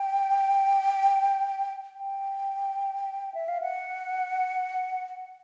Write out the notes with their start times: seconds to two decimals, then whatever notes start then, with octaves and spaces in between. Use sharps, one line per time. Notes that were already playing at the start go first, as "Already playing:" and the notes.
Already playing: G5
1.97 G5
3.34 E5
3.48 F5
3.62 F#5